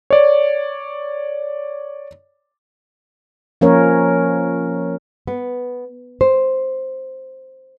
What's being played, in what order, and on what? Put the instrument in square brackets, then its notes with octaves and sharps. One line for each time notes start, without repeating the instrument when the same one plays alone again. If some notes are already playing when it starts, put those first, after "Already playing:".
[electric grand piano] C#5 D5
[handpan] F3 A#3 C#4 A#4 C#5
[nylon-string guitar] B3
C5